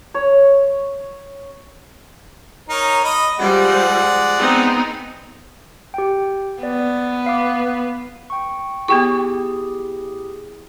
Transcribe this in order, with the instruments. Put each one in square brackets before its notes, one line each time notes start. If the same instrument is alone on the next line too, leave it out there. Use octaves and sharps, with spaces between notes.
[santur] C#5
[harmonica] D#4 A#4 C#5
D#5 B5
[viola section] F3 G3 [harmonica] G#3 D5 F#5
[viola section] B3 C4 D#4
[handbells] G4 G5
[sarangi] B3 [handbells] D5
[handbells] F5 D6
G5 C#6
[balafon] B3 G5 C#6 [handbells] E4 G4 G#4